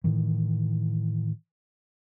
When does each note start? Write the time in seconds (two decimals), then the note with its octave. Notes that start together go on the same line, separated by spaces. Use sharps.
0.04 A2 D#3 E3